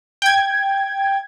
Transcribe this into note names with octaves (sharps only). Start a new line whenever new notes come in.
G5 G#6